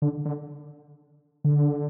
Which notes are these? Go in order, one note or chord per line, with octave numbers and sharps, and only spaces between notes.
D3
D3
D3